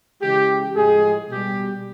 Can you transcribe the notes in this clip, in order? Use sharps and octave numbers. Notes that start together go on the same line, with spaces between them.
C#3 E3 G#3 G4
A2 F3 G#3 G#4
B2 G3 G4